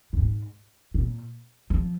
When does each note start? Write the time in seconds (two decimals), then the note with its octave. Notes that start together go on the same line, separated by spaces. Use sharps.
0.13 A#2
0.18 G#2
0.94 A#2
1.70 F3